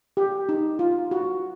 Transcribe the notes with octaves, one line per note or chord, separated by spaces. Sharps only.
G4
D#4
F4
F#4